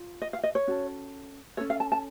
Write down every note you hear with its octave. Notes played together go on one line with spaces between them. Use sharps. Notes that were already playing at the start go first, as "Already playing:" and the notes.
Already playing: F4
D#5
F5
D#5
C#5
C#4 F#4 A4
C#4 F#4 A4 C#5
F5
A5
A5